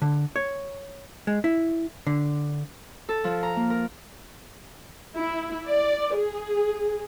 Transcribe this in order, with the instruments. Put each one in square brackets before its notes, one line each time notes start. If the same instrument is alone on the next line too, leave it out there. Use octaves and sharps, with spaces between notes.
[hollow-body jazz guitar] D3
C#5
G#3
E4
D3
[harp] A4
F3
A#5
A#3
A#4
[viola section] E4
D5
G#4